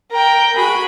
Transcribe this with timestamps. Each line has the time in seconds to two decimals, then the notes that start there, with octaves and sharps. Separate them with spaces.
0.11 A#4 G5
0.56 F#4 G#4 B5